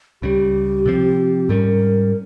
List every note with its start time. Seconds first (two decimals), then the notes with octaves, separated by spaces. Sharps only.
0.22 C#2 C#3 G3 G4
0.86 C3 F3 C4
1.49 G#2 G3 C#4 A#4